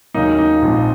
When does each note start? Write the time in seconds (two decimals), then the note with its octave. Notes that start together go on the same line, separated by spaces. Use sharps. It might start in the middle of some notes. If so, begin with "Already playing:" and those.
0.14 D#2 C#3 F#3 A#3 D#4
0.39 D#4
0.62 A#1 G#2 F3 C4